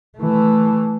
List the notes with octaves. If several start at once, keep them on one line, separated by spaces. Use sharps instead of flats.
E3 A3